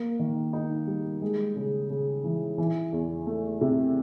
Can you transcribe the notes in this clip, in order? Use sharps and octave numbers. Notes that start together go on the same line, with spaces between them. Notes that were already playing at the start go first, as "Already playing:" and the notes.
Already playing: A#3
D#3
D#4
G3
G#3
C#3
C#3
E3
E3
E2
A3
C3